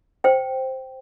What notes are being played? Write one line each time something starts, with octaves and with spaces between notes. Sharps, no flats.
C5 G5